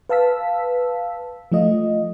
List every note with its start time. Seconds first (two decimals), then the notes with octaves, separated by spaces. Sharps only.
0.09 B4 F5 A5 E6 B6
1.52 F3 A3 F4 D#5